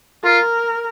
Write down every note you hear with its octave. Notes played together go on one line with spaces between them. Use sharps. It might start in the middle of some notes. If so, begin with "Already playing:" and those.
F4 A#4